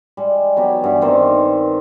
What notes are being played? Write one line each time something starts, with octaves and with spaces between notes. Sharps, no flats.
G3 G#3
F#3 B3 G4 G#4
G2 E3
D#3 C4 C5 D5